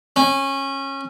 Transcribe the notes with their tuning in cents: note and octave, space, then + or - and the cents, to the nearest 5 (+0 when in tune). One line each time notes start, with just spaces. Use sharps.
C#4 -20